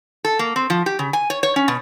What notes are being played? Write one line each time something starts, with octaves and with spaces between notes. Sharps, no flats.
A4
A#3
C4
F3
G4
C#3
G#5
C#5
C#5
C#4
B2